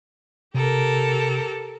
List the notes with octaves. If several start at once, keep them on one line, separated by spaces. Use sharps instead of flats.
C3 G4 A4 A#4